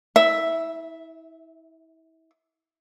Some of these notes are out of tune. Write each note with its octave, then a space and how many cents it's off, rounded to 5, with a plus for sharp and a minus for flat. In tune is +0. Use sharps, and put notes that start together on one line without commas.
E4 -30 E5 +0